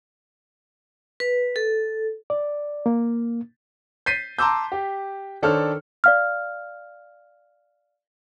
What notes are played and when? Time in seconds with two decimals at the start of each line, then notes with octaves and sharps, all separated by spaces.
1.20 B4
1.56 A4
2.30 D5
2.86 A#3
4.06 G6 A6 B6 C7 D#7
4.39 A5 A#5 C6 D6 E6 G6
4.72 G4
5.42 D#3 D4 A4 C5 C#5 F6
6.04 D5 F5 F6